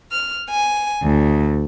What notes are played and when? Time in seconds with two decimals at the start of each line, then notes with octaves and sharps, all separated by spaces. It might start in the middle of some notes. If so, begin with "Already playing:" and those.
0.11 F6
0.49 G#5
1.02 D2